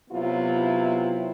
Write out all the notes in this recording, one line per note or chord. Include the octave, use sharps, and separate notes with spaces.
C3 F#3 B3 E4 F4